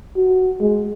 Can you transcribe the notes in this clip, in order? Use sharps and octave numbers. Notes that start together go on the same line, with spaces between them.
F#4
G#3